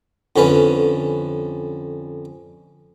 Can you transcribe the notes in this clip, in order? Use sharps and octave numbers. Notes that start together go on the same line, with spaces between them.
F2 D3 C#4 B4